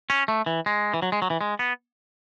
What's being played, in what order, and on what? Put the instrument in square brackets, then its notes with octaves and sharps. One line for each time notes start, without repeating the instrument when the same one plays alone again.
[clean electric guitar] C#4
A3
E3
G#3
E3
F#3
G#3
F#3
E3
G#3
B3